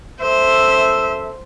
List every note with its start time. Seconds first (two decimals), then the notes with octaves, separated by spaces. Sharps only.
0.22 F#2 A4 C5 E5